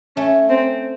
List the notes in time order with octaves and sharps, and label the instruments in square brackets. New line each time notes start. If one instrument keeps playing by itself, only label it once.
[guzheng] A3 [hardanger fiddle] C#4
[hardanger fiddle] C4